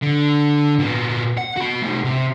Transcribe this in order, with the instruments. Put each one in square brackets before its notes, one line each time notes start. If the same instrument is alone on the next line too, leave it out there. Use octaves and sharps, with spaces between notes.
[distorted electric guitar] D3
A#2 B3
F#5
F#4 B5
A3 D#4
C3